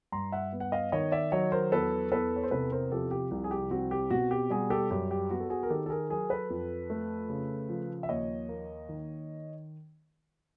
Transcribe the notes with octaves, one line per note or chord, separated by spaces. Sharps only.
G2 A#5 C6
E5 F#5
B3
F#5
D#5 F5
D#3 C#5 D#5
D5 E5
F#3 C#5 D#5
A#4 C5
E2 A4 B4
E2 A4 B4
C#5
C5
C3 A4 B4
A#4 C5
F3 G4 A4
G4
C2 G4
G#4
G4
C4 F#4
G4
B2 F#4
G4
G3 F#4 G#4
G4 A4
F#2 G4
G4
B3 F#4
A4
F#4 G#4
A#4
D#3 G4 A4
A4
G#4 A#4
F#3 G#4 A#4
A4 B4
F2
A3
C#3
F3
E5
D#2 C#5 D#5
A#3
D#3